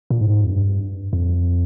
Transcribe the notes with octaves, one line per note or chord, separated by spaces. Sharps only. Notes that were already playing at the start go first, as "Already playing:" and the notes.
A#2
G#2
F2
G2
F2